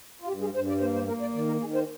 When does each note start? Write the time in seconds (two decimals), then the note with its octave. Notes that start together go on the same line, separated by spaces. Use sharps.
0.21 F4
0.28 G2 G4
0.41 G#4
0.54 G2 C5
0.68 D5
0.81 A#3 C5
0.95 C5
1.07 A#3 A#4
1.21 D5
1.34 D#3 D5
1.47 A#4
1.60 D#3 G#4
1.74 C5